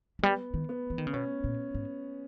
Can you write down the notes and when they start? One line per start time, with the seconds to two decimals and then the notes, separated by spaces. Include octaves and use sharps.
0.19 E3
0.23 G3 B3
0.54 D#3
0.69 B3
0.90 E3
0.98 D#3
1.07 C#3
1.13 B2 C#4
1.44 A#2
1.74 G#2